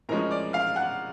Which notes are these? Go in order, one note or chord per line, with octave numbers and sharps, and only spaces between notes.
A2 F3 G#3 C#4 A#4 A#5
D5 D6
F5 F6
F#5 F#6